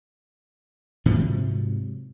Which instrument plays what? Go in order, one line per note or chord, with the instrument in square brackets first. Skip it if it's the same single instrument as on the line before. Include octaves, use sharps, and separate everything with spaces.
[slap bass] G#2 C3 F3 F#3